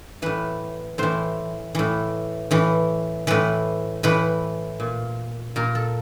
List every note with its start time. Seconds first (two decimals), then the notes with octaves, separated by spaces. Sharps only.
0.22 A2 E3 B4
0.98 A2 E3 C5
1.75 A2 E3
2.51 A2 E3
3.27 A2 E3 B4
4.03 A2 E3 B4
4.80 A#2
5.56 A#2 A#4
5.75 A4